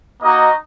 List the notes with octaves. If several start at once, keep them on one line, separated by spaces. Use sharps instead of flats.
A#3 D#4 F#4 D#5